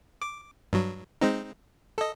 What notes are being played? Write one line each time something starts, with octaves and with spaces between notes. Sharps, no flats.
D6
G2 F#3
G#3 C4 D#4
A4 D#5